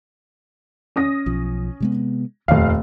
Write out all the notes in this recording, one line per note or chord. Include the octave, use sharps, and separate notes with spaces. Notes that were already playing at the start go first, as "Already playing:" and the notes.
C#4 D#6 A#6
B1 F3
C3 G#3 B3
F1 D#2 A#2 F5